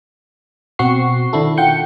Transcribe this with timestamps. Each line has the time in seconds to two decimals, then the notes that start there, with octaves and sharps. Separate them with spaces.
0.79 B2 C4 F#4 F#5 C#6 C7
1.33 D#3 D4 E4 A4
1.58 F4 F#5 G5 G6 C#7